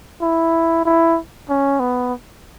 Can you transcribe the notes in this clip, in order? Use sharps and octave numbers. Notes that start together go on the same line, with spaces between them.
E4
E4
C#4
B3